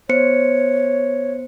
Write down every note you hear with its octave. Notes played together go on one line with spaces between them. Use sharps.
B3 C5 C#5 C#7